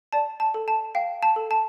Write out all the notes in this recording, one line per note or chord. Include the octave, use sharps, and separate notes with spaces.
D5 A5
A5
A4
A5
F5 G5
A5
A4
A5